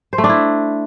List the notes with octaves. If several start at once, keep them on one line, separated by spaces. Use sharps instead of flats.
C5
A3
D4
E4